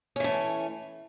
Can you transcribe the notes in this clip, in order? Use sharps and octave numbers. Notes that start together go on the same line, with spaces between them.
E3 A3 C#4